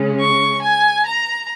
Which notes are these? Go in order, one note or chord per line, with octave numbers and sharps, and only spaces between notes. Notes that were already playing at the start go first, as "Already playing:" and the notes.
Already playing: C#3 G#3 C#4
C#6
G#5
A#5